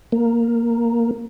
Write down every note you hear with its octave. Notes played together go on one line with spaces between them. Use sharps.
A#3